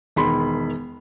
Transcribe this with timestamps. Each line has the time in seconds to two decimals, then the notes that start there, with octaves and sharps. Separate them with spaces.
0.16 E1 D#3 B5 C6